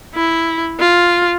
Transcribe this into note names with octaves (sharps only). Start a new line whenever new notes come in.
E4
F4